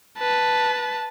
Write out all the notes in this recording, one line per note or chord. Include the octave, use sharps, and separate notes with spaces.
B4 A5